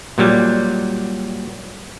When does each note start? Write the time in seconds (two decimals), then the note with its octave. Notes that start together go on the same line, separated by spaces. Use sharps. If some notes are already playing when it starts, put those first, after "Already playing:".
0.18 A#2 F#3 G3